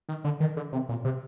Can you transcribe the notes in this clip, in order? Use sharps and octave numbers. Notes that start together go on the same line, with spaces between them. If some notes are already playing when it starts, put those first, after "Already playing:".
D#3
D3
D#3
D3
C3
A#2
C3